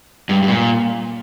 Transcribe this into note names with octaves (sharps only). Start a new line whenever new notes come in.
G2
G2
A#2